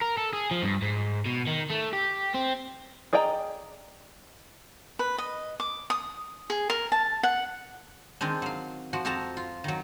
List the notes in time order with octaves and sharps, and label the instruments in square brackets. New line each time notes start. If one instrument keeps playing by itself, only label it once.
[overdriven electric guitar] A#4
A4
G#4
F3
G2
G#2
B2
D#3
A3
G4
C4
[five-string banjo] G#4 D5 D#5 G5 A#5
[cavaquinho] B4
D#5
D6
D#6
G#4
A#4
A5
F#5
[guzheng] D#3 G#3 C4 D4
F#3 F5
F3 F#4
F2 C4 F#4 A5 A#5
F4
D#3 F#3